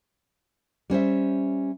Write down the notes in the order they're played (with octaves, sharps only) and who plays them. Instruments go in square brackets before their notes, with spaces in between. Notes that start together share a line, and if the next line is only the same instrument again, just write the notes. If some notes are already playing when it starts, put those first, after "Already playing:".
[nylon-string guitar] G3 C#4 C5 E5